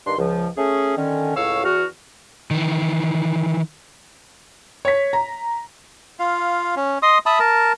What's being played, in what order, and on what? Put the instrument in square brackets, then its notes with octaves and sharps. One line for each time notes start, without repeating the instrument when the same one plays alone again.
[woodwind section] G2 D#3 D4 C6
C#2 F3
A3 C#4 G#4
D3 D#3 C#4
C#2 A2 C#5 F5 C#6 E6
E2 F#4 F6
[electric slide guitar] D#3 E3
[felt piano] C#5 B6
A#5
[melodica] F4 F5
C#4
D#5 C6 D#6
E5 A5 B5 D#6
A#4 A5